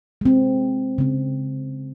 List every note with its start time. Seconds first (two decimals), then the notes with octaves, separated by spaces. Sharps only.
0.21 G#3 C4
0.98 C#3 C4